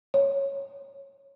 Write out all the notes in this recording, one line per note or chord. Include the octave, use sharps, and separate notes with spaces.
C#5